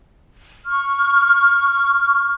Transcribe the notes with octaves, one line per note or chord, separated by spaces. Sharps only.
C#6 F6